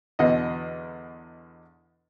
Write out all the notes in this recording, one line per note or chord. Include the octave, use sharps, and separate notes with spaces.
E2 B2 D3 D#5